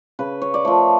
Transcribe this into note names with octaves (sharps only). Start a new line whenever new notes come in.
C#3 B4
C#5
D5
F3 A3 C#5